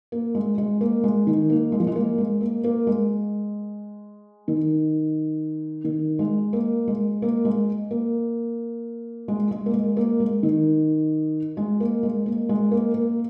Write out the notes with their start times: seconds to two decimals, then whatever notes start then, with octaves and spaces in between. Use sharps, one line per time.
0.12 A#3
0.35 G#3
0.58 G#3
0.81 A#3
1.04 G#3
1.27 D#3
1.50 A#3
1.72 G#3
1.80 F3
1.87 G#3
1.96 A#3
2.18 G#3
2.41 A#3
2.64 A#3
2.87 G#3
4.48 D#3
5.84 D#3
6.19 G#3
6.53 A#3
6.88 G#3
7.22 A#3
7.45 G#3
7.91 A#3
9.28 G#3
9.51 G#3
9.66 A#3
9.74 G#3
9.97 A#3
10.20 G#3
10.43 D#3
11.57 G#3
11.80 A#3
12.03 G#3
12.26 A#3
12.49 G#3
12.71 A#3
12.94 A#3